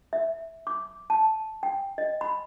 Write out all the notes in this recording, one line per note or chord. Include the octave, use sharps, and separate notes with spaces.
E5
D6
A5
G5
D#5
B5